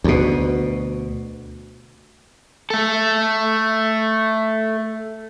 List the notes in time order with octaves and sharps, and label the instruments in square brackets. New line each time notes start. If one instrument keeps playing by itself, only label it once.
[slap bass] D2 B2
[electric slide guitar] A3 A4